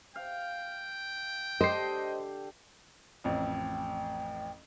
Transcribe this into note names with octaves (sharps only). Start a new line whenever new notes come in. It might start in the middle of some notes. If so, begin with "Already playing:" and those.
F5 G5
D3 G4 C5 D#5 C7
A1 F2 G5